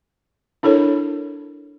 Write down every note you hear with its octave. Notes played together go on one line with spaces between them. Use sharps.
D4 E4 A4 A#4 C#5